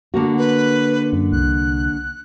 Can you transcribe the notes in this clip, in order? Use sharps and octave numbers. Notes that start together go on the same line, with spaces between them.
D3 A#3 F#4
B4
F#2
C2 F#6